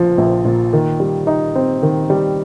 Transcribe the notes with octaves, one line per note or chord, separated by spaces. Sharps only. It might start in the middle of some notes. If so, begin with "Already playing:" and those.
Already playing: A#1 A#2 F3
A#1
A#2
D#3
G3
D#4
C4
D#3
G3